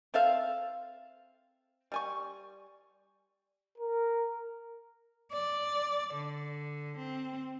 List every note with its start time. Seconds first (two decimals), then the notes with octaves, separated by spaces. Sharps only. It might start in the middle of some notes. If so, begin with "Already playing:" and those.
0.14 C4 A4 E5 F5
1.92 G3 G#5 C#6
3.79 A#4
5.33 D5
6.15 D3
6.98 C4